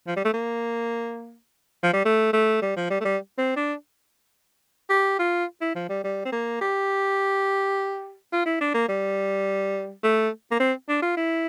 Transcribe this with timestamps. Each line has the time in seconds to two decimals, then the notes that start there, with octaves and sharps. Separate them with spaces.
0.07 F3
0.16 G3
0.25 A3
0.34 A#3
1.83 F3
1.93 G3
2.05 A3
2.33 A3
2.62 G3
2.76 F3
2.90 G3
3.01 A3
3.05 G3
3.38 C4
3.56 D4
4.90 G4
5.19 F4
5.61 E4
5.75 F3
5.89 G3
6.04 G3
6.25 C4
6.32 A#3
6.61 G4
8.32 F4
8.46 E4
8.61 D4
8.74 A#3
8.89 G3
10.03 A3
10.52 A#3
10.60 C4
10.89 D4
11.02 F4
11.17 E4